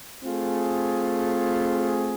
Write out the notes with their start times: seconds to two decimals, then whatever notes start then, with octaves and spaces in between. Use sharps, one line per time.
0.24 A3 C4 F4 G#4